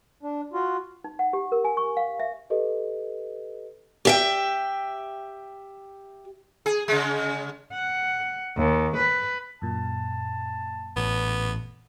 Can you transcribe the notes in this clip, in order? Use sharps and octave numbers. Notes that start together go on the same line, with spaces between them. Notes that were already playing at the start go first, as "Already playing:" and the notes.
D4
F4 F#4
D#4
F#5
G4
A#4
G#5
C#6
F5
E5
G4 A4 B4 D#5
G4 E5 G5
G#4
C#3 G#3
F#5
D#2
B4
F#2 A#2 A5
A1 B3